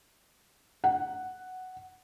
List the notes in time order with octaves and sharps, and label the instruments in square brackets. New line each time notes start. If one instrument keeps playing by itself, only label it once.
[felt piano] F#5